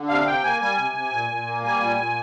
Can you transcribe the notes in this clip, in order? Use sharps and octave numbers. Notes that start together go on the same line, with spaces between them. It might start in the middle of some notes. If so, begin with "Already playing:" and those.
Already playing: D3
C3 F5
C3 G5
A#3 G#5
G3 G#5
C3
C3
A#2
A#2
A#3
G3 G#5
A#2
A#2